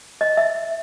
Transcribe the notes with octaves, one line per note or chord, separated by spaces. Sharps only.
D#5
E5